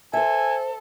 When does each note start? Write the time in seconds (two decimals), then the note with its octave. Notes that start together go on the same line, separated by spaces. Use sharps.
0.13 A4 C5 E5 G#5